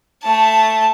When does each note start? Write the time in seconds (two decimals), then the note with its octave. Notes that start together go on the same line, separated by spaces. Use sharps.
0.23 A3 A5